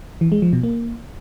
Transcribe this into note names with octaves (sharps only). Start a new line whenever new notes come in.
E3
G#3
F3
B2
A#3